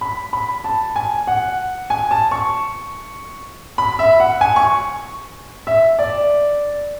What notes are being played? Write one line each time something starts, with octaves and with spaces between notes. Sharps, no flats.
B5
B5
A5
G#5
F#5
G#5
A5
C#6
B5
E5
F#5
G#5
C#6
E5
D5